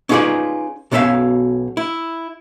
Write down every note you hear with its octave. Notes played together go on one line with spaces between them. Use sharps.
C#4 D#4 F4 G#4 B4 D5
B1 B2 C#4 E4 E5 F5
E4